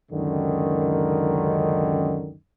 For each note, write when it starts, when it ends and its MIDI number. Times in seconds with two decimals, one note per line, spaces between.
0.12 2.35 37
0.12 2.35 42
0.12 2.35 50
0.12 2.35 51